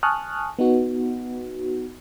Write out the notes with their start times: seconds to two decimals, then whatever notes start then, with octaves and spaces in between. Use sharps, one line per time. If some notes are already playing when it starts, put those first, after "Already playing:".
0.03 G#5 A5 C#6 D#6 F6 F#6
0.59 B3 D#4 F#4